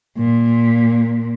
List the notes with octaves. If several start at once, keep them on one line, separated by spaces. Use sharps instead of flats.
A#2